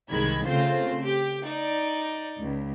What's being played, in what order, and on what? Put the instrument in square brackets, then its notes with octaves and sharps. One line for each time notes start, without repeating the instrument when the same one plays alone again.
[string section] C2 D#3 G#3 B5 G#6
C#3 A3 C4 F4 C5
G4
D#4 D5
C#2